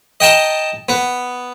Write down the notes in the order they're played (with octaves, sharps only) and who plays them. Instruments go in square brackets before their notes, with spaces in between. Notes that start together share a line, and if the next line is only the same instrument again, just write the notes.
[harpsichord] D#5 G5 A5 A#5
B3